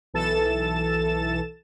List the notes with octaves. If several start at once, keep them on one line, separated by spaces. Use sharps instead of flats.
B1 E3 A4 A6 E7